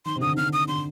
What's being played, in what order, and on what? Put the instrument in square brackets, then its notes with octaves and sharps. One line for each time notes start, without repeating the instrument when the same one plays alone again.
[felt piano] D#3 [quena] C6
[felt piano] C3
[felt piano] D3 [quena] D#6
[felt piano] D#3
[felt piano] D3 [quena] F6
[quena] D#6
[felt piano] D3 [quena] C6